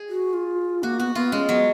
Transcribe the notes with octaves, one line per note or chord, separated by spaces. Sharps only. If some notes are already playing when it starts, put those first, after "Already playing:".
Already playing: G#4
F#4
F4
A#3 F#4
B3 F#4
B3 F4
G#3 C#4
F#3 B3